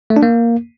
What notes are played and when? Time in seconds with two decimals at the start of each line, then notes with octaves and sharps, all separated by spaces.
0.10 A3
0.16 D4
0.23 A#3